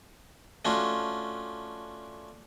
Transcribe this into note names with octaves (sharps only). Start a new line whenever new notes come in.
A3 C#4 D4 F4 F#4